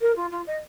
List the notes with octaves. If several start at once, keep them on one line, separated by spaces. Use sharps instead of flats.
A#4
F4
F4
D#5